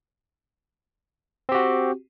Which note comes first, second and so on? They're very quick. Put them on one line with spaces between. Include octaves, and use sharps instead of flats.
C4 G4 F#4